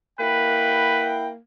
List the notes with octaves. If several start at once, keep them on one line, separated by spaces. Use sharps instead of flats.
A#3 E4 B4 F#5 G5